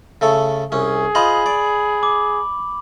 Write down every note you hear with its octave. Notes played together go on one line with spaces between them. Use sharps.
C#3 A3 A4
C2 C#4 G#4
F4 C5 D#5 B5 F#7
D5
D6